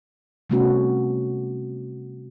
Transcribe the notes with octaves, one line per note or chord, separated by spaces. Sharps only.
C3 G3 A3 B3 C#4 F#4